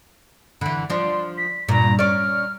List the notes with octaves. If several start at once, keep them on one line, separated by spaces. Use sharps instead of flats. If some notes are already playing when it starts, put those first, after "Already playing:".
D3 E3 B5
F3 D4 C6
B6
G2 A#2 A#5
C#4 D5 F6